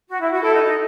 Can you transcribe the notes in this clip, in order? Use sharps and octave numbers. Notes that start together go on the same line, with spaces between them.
F#4
E4
F#4
E4 A4
D#4
D#4